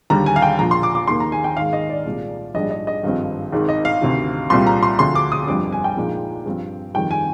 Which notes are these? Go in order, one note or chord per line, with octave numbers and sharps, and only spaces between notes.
D#2 D3 G3 A#5
G#5
F5
G5
A#1 A#2 F3 A#5
C6
D6
D6
D#2 D#3 A#3 C6
A#5
G#5
G5
G#2 D#3 G#3 F5
D#5
D5
C2 A#2 G#3
A#1 G#2 G3 D4 F4 D#5
D#5
D#5
G#1 G2 F3 C4
G#1 G#2 D#3
D#5
F5
D2 C3 D#3
C2 A#2 G3 C4 C6
A#5
C6
D2 D3 F3 C4 C6
D6
D#6
G1 F2 D3 G3 D6
G#5
G5
A#1 A#2 G#3 D#4
G2 F3 C4
F2 D#3 G3 G5
G#5